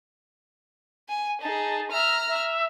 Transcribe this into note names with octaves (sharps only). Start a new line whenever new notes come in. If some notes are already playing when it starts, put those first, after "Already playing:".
G#5
D#4 G#4 A5
E5 A#5 F6
E5